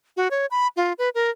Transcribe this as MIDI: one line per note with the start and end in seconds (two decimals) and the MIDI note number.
0.17 0.28 66
0.31 0.46 73
0.51 0.67 83
0.76 0.93 65
0.98 1.09 71
1.15 1.30 70